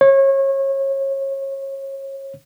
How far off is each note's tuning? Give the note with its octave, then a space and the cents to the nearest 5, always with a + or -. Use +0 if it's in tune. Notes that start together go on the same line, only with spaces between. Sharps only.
C#5 -30